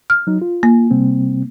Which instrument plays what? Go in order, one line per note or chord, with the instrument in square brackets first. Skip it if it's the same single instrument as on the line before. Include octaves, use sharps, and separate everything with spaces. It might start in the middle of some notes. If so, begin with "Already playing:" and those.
[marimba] F6
[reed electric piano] F#3 D#4
F4
[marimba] A#3
[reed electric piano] C3 G3 C4